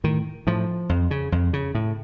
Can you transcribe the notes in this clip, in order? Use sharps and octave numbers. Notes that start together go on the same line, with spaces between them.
A2 D#3
A2 F3
F2
C#3
F2
C#3
A2